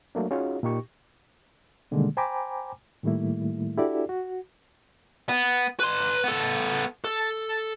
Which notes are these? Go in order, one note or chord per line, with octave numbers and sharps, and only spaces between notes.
F#3 A3 A#3 D4
C#4 D#4 F4 F#4 G#4 C#5
A#2 D#4 G4 C#6
B2 D3 D#3 G3 G#3 A#3
C5 G5 G#5 A#5 B5 D6
A2 D#3 G3 A3 A#3 E4
D4 E4 F#4 G4 A4 D5
F#4
B3
B4 C6
B3 A4
A4